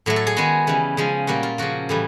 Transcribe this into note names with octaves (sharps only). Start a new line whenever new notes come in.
A2 F#3 A3
A4
G#4
D#3 G#3 B3 F#4
C#3 E3 G3
C#3 F3 G#3
A#2 G3 A#3 F#4
F4
C#3 F3 A#3 F#4
A2 E3 G3